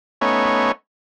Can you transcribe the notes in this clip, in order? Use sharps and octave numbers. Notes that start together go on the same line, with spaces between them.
A3 B3 C#4 D#4 C#5